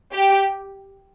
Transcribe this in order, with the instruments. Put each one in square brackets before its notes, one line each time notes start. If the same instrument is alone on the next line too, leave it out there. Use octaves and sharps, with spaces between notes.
[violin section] G4